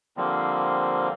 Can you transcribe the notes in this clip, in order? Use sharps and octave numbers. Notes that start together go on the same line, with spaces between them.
D3 F3 G3 A#3 C4